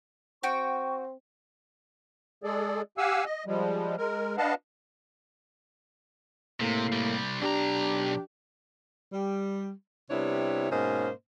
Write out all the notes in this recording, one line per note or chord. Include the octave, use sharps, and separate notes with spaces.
C4 F#4 G5 C#6
G#3 G#4 A4 D5
G4 F5 F#5 G#5 E6
D#5
F3 G3 G#3
G#3 A#4
D4 B4 D#5 F5 F#5 A5
A2 C3 A#3
C2 G3
B1 D4 G4 A#5
G3
C3 G3 B3 D4 E4 C#5
G#2 B2 A#3 C#4 C5 D#5